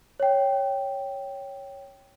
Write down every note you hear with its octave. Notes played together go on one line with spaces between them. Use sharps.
C#5 G5